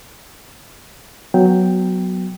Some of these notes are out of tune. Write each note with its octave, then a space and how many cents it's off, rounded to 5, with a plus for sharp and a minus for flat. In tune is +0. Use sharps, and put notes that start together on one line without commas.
F#3 +0 B3 +0 G5 +0